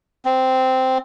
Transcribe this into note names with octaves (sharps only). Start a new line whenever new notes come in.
C4